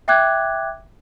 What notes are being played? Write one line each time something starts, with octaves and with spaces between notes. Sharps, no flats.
E5 G5 D6 F#6 G#6